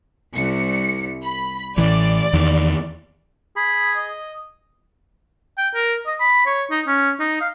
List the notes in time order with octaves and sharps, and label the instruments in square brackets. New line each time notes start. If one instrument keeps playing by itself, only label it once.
[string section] C2 C#7
B5
[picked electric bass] A1 E3 [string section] D5
[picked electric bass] E2 D#3
[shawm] G#4 [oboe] B5
[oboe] D#5
[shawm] G5
A#4
D#5
B5
C#5
D#4
C#4
D#4
F5